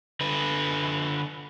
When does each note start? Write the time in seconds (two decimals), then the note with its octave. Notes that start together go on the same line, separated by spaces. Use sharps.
0.21 D3 B4